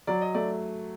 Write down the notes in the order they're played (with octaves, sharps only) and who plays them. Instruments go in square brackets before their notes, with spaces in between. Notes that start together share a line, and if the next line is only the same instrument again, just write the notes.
[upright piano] F#3 [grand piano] D5
[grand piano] D#5
[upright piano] A3 [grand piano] D5